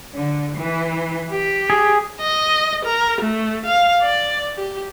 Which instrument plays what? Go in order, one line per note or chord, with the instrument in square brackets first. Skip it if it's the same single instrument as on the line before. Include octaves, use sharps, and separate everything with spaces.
[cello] D3
E3
G4
[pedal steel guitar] G#4
[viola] D#5
A#4
A3
F5
D5
G4